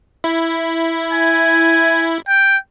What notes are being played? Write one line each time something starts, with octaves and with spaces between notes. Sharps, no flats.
E4
G#5
G5